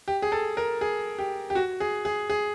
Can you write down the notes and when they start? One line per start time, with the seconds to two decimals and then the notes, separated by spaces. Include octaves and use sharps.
0.08 G4
0.22 G#4
0.32 A4
0.57 A#4
0.81 G#4
1.18 G4
1.50 G4
1.55 F#4
1.80 G#4
2.05 G#4
2.30 G#4